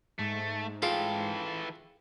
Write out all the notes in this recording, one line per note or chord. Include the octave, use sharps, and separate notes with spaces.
G#2 A3
E3 F4 G#4 A4 F5 G5